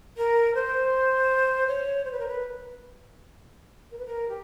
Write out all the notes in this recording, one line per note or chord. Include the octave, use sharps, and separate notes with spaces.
A#4
C5
C#5
C5
B4
A#4
B4
A#4
B4
A#4
G4